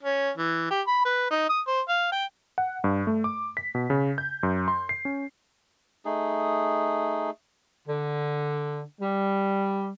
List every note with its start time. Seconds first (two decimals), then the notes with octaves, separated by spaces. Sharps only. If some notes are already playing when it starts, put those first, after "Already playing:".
0.03 C#4
0.37 E3
0.70 G4
0.87 B5
1.05 B4
1.30 D#4
1.49 D#6
1.67 C5
1.89 F5
2.12 G5
2.58 F#5
2.84 G2
3.07 A3
3.24 D6
3.57 B6
3.75 B2
3.90 C#3
4.18 G6
4.43 F#2
4.68 C6
4.89 C7
5.05 C#4
6.05 A3 D#4 G#4
7.88 D3
9.01 G3